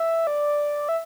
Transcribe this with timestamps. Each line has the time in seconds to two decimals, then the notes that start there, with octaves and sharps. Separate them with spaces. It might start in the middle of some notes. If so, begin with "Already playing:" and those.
Already playing: E5
0.27 D5
0.89 E5